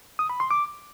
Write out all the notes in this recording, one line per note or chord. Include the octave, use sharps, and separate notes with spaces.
D#6
B5
C6
D6